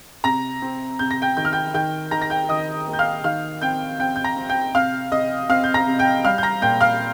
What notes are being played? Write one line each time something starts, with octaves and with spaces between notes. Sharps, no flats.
C3 A#5 A#6
C4
C3 G6
A#6
G5 G6
D#3 G6
F6
G5 G6
D#3 G5 G6
D#3 A#5 A#6
A#6
G5 G6
D#3 D#5 D#6
A#3
G6
F5 F6
D#3 F5 F6
C4 G5 G6
C4 G5 G6
G6
A#5 A#6
C4
G5 G6
C3 F5 F6
C3 D#5 D#6
C4 F5 F6
G6
A#5 A#6
C3
G5 G6
G3 F5 F6
G6
A#5 A#6
A#2 G5 G6
F5 F6